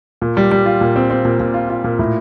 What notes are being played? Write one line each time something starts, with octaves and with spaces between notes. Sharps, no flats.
A#2
G3
G3
F4
A#2
C4
C4
A#2
A#2
F4
F4
A#2
A2